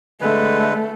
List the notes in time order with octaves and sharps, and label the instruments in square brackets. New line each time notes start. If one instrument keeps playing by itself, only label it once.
[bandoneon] D3 G#3 B4 [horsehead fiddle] A3